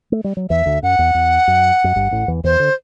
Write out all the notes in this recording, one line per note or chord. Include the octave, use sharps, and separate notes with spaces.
A3
G3
F#3
E2 E3 E5
D2 D3
F#2 F#5
E2
E2
F#2
F#2
G1 G2
A1 A2
E2 E3
E2 E3 C5
D3